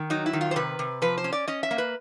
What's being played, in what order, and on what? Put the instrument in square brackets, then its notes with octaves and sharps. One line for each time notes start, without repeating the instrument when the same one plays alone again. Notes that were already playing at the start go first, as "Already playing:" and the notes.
Already playing: [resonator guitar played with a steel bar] D#3
F#3 D#4
E4
D#3
F4
C5
C3 B4
C3
F3 B4
C5
C#4
D5
C#4 D#5
E5
A#3
B4